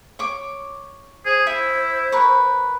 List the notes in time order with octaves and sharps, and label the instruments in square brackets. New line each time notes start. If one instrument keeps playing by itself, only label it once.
[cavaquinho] C#5 C#6 D6
[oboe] G#4 [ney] C5
[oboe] E4 [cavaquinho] E5
[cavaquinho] A#4 B4 C#6